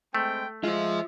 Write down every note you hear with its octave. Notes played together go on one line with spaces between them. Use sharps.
G#3 A3 C4 G5
G#3 F4 C5 E5